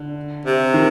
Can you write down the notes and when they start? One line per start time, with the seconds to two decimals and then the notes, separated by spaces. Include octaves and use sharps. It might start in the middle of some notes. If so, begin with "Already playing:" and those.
Already playing: D3
0.45 C3
0.74 D#3